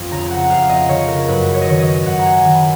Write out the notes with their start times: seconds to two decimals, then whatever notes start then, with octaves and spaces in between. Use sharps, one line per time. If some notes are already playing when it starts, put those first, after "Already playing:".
Already playing: F2
0.11 C#3 A#5
0.31 F#5
0.50 F2 F5
0.69 D#5
0.89 C#3 C#5
1.08 A#4
1.28 F#2 B4
1.54 C#5
1.61 D#5
1.67 D#3 C#5
1.79 D#5
2.06 F#2 F#5
2.19 A#5
2.26 G#5
2.45 D#3
2.55 B5